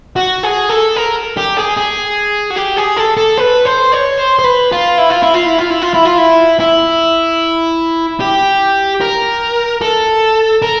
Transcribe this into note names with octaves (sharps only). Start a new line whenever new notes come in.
F#4
G#4
A4
A#4
G4
G#4
G#4
F#4
G4
G#4
A4
A4
B4
C5
C#5
C5
C5
B4
F4
E4
F4
E4
F4
E4
F4
E4
F4
E4
F4
E4
E4
G4
A#4
A4
A#4